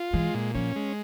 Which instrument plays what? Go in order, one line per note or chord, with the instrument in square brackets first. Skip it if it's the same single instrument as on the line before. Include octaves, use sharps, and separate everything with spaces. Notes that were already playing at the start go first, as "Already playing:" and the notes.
Already playing: [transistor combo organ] F4
[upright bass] E3 [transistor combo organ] G#3
[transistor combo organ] A#2
[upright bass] F3 [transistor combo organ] C#4
[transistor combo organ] G#3